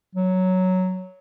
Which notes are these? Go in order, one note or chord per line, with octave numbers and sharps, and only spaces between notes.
F#3